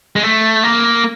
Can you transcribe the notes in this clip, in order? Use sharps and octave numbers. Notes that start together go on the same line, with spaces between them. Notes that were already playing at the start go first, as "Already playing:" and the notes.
G#3
A3
A#3